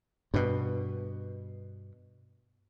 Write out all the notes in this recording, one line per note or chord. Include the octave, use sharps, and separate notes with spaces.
G2 B2